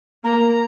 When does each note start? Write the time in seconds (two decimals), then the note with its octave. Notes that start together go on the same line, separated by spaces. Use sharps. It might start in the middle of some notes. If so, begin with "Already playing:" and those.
0.24 A#3 A#5